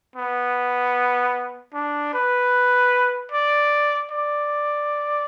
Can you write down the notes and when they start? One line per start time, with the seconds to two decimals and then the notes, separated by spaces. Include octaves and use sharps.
0.16 B3
1.74 D4
2.14 B4
3.32 D5
4.11 D5